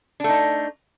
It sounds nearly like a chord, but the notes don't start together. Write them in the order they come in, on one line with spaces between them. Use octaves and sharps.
D4 A3 D#4